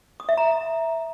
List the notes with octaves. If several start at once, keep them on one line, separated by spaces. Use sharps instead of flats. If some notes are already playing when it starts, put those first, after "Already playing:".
D#6
E5
A#5